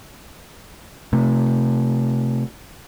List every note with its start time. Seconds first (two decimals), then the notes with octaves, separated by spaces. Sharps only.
1.13 C3 A3